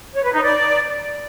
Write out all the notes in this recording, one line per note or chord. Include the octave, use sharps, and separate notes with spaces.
C#5
B4
D#4
D5